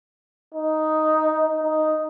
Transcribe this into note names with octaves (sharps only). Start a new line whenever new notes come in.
D#4
D#4